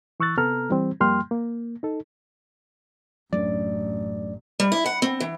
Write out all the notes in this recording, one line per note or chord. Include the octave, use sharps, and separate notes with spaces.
E3 C#6 E6 F#6 A6
C3 B3 A4 A#5 F6
E3 G3 C4
F2 G3 A#3 G5 C6 F6
A#3
D#4 A4
A1 F#2 F#3 A3 D4 D5
G3
E4
F#5
C4
E3